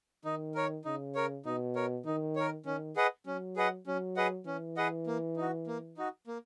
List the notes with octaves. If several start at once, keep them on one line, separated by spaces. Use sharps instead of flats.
D#3 D#4
A#4 C#5
C#3 D#4
A#4 C#5
B2 D#4
A#4 C#5
D#3 D#4
A#4 C#5
D#3 C#4
G#4 B4 D#5 F#5
F#3 C#4
G#4 B4 D#5 F#5
F#3 C#4
G#4 B4 D#5 F#5
E3 C#4
G#4 B4 D#5 F#5
A#3
D#4 F#4
A#3
D#4 F#4
A#3